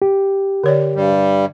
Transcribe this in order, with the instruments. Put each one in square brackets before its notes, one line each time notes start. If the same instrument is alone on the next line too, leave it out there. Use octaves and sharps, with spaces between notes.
[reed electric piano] G4
[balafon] D3 C#5 D5
[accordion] G2 G3